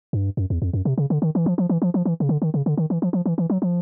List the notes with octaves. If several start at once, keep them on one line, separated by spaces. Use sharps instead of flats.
G2
F#2
E2
F2
F#2
C3
C#3
D3
D#3
E3
F3
F3
E3
F3
F3
E3
C#3
D3
D#3
C#3
D3
D#3
E3
F3
F3
E3
E3
F#3
F3